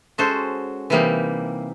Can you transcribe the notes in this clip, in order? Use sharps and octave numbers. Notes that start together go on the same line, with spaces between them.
G#3 C#4 F#4 A4 C5
C3 E3 G3 A#3 D#4